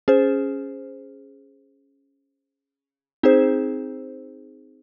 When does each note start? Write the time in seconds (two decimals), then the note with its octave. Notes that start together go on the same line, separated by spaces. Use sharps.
0.08 C#4 G#4 C5
3.23 C4 D#4 G#4 C5